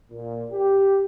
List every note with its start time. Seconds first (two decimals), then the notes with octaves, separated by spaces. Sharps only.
0.12 A#2
0.51 G4